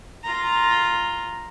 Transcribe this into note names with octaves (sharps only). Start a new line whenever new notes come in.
F4 A#5